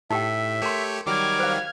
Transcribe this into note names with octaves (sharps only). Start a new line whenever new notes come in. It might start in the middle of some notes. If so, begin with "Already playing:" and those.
A2 D#4 G4 E5 G5
A3 G4 A#4 C#5 C6
D#3 F#3 G3 D6 F6 G#6
C5 F5